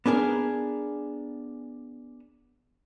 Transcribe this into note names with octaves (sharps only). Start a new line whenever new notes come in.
B3 D4 G#4 A#4